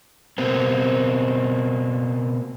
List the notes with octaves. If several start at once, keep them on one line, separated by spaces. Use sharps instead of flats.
B2 A#3 C4